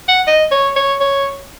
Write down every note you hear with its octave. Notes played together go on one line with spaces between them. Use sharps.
F#5
D#5
C#5
C#5
C#5